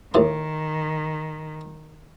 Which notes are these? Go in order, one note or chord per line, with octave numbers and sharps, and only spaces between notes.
D#2 A2 D#3 C6